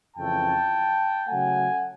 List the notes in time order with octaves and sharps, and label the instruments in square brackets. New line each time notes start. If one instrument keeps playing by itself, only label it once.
[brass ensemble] F2 C#3 E3 A3 G5 A5
C#3 F#3 A3 F#5 G#5